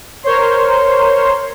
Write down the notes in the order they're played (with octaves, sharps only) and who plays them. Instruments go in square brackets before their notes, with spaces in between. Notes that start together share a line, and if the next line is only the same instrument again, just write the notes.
[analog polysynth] A#4 C5 C#5 C6